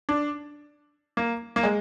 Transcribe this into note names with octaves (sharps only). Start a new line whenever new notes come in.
D4
A#3
A#3
G#3